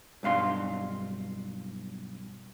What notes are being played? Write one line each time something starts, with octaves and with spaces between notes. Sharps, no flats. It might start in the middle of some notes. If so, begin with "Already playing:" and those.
B1 G2 F5 C6